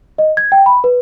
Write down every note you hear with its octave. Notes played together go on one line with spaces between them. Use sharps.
D#5
G#6
G5
B5
B4